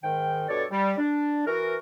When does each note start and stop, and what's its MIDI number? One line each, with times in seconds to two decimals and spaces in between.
0.04 0.44 44
0.04 0.44 51
0.04 0.44 79
0.48 0.65 43
0.48 0.65 47
0.48 0.65 69
0.48 0.65 73
0.48 0.65 74
0.71 0.94 55
0.98 1.47 62
1.47 1.77 52
1.47 1.77 66
1.47 1.77 70